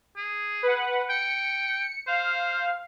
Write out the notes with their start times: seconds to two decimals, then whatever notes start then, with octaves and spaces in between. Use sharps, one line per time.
0.17 G#4
0.63 B4 F#5
1.10 G5 C#7
2.07 C5 F5